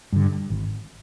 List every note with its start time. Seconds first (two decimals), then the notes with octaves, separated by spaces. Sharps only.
0.13 G2 D3
0.50 G#1